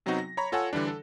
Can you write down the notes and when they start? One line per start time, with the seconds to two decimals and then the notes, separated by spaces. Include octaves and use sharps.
0.06 C3 F#3 B3 C4 D#4 F#4
0.18 A#6
0.37 C#5 A#5 B5 C#6 A#6
0.52 F4 A4 C#5 F#5 G#5 E6
0.73 D3 E3 G3 D4
0.87 A4